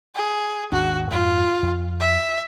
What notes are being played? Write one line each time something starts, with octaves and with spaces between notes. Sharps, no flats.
G#4
G#1 D#2 D4 F#4
F2 G#2 F4
F2
E5